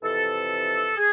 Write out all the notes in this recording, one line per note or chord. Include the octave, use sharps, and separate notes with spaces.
F2 C3 E3 A4
G#4